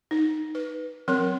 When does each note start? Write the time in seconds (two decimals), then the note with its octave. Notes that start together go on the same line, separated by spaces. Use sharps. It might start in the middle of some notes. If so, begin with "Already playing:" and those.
0.11 D#4
0.55 B4
1.08 F#3 C4 A#4 C6